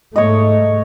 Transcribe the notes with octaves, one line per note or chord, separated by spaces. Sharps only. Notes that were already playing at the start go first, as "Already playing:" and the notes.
G#2 A3 C#5 D#5